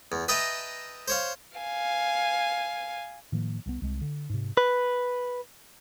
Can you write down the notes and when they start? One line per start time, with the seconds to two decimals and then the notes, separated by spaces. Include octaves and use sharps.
0.12 E2
0.28 B4 D#5 E5 G5 A5 A#5
1.08 C5 C#5 F5
1.58 F5 G#5
3.32 A2 D#3 F3 A#3
3.66 C2 E3 B3
3.82 C2 G#3
4.02 D3
4.30 G#2 C3
4.57 B4